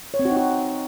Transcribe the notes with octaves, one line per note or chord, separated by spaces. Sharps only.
C#5
C4
F#4
D#4
F#4